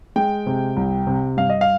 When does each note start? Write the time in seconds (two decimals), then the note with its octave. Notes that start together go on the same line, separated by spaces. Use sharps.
0.16 G#3 G5
0.46 C3
0.76 C2
1.07 C3
1.37 G2 F5
1.50 D#5
1.61 F5